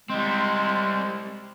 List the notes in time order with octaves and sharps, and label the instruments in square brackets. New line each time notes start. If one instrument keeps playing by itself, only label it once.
[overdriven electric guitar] G3 C4 [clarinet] G#3